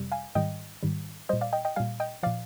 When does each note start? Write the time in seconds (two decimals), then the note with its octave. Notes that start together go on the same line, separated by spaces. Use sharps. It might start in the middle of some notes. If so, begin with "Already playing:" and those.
Already playing: F2 C3 G3
0.12 F5 G#5
0.35 G#2 D#3 G3 D#5 G5
0.83 G#2 D#3 G3
1.29 A#2 G3 C5 D#5
1.41 D5 F5
1.53 D#5 G5
1.65 D#5 G5
1.76 A#2 G3 F5 G#5
2.00 D#5 G5
2.23 A#2 F3 D5 F5